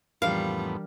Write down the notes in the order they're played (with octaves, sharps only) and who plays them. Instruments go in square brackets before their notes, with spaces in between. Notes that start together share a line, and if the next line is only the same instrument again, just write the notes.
[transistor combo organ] F2 A2 B3 [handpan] E3 D4 A#4 [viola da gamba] G3 [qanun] F5